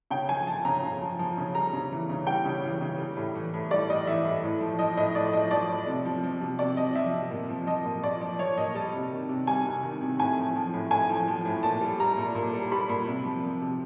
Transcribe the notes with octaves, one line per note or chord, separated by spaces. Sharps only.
C#3 G5
F3 G#5
F3 A5
C#3 A#5
C#3
F3
F3
C#3
G3 A#5
C#3
E3
C#3
G3 G5
C#3
E3
C#3
G3
A2
E3
A2
G3 D5
A2 D#5
E3 E5
A2
A2
F3
F3 D#5
A2 D#5
A2 D5
F3 D#5
F3 D5
A2
C3
F3
F3
C3
C3 D5
F3 D#5
F3 E5
C3
A#2
F3
F3 D#5
A#2
A#2 D5
F3
F3 C#5
A#2 D#5
G3 A5
C3
D#3
C3
G3 G#5
C3
D#3
C3
A2 G#5
F3
F3
A2
A2 G#5
F3
F3
A2
A#2 A5
G3
G3 A#5
A#2
A#2
G3
G3 B5
A#2
C3
F3
F3
C3